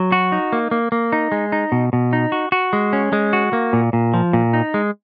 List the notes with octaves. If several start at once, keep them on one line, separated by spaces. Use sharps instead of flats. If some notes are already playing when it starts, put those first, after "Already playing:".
Already playing: F#3
F#4
D#4
A#3
A#3
A#3
D#4
G#3
D#4
B2
B2
D#4
F#4
F#4
G#3
C#4
G#3
F#4
A#3
A#2
A#2
F3
A#2
D#4
G#3